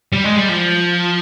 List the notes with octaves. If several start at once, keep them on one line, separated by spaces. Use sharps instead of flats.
G3
G#3
G3
F3